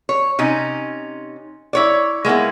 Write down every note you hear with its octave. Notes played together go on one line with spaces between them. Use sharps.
C#5
C3 C#4 D#4
E4 C#5 D5
G#3 A#3 B3 E4